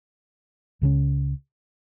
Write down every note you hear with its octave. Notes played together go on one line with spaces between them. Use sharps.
C#2 C#3 G#3 C#4